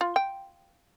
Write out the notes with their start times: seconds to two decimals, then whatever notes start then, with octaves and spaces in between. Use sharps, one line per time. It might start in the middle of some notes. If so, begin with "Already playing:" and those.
0.01 F4
0.16 G5